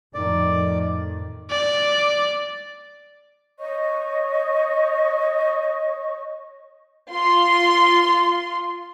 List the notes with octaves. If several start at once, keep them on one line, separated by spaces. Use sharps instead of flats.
F2 A2 D#3 D5
D5
C#5 D#5 C#6
F4 C6